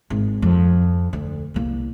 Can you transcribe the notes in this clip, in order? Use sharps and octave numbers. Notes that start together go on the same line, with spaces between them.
G#1
F2
D2
C2 A#3